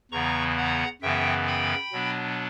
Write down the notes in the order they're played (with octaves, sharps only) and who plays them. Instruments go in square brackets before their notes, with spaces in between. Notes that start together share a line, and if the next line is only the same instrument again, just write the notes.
[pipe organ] E2 C#3 E3 B3 A#5 C#6
F#5 A#5
F#2 C#3 E3 B3 E5 G5
G5 B5
B2 F#3 B3 D4